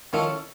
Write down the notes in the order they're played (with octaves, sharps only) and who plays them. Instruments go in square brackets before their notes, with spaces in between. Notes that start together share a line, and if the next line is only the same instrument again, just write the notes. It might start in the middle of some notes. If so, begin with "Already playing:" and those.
[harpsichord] D#3 F3 [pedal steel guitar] C#4 E4 A4 C#5